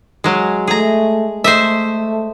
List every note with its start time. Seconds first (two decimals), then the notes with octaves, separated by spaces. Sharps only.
0.24 F#3 G#3
0.67 A3 G#4 A#5
1.44 A3 C5 D#5 E5